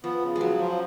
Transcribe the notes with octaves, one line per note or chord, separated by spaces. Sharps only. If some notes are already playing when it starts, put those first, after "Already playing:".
F3 B3
C#3
G#3
C#3 F#3
F3